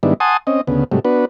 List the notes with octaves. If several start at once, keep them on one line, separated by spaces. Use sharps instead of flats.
G#2 D#3 G3 B3 D4 E4
F#5 G#5 A5 C6 D#6
C4 C#4 D#5
D2 C#3 B3
G#2 C3 F#3 G3 A3
B3 D4 F#4 B4